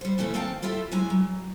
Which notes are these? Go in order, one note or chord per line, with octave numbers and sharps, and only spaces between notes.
G3 C5
A#2 E3 A3 C#4 E4
D#2 A3 C4 F5 G5 A5
A3 E4 F4 G4 A4
F#3 G#3 E4 G#5
F#3